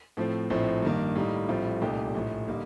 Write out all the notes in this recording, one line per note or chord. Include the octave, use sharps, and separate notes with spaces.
A2 F3 A3 C4
A#1 A2 F3 C4
G2 D#3 A#3
A2 G3 A#3 D#4
A#1 A2 G3 C4 F4
C2 A#2 A3 D#4 G4
A#1 A2 F3
D3 G3 A#3 D#4